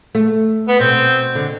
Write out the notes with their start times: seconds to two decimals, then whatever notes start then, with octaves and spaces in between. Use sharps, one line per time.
0.15 A3
0.68 B3
0.80 B2 C4
1.35 D3